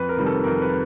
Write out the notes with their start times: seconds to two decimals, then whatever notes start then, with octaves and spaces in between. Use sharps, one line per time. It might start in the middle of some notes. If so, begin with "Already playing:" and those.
Already playing: F2 B4
0.09 A#4
0.17 C3 D#3 G3
0.26 A4
0.44 F2 A#4
0.62 B4